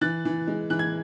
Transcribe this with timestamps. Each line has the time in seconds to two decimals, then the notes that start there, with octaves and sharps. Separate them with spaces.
0.01 E3 F#6 A6
0.25 E3
0.47 G#3
0.70 E3 F#6
0.79 G#6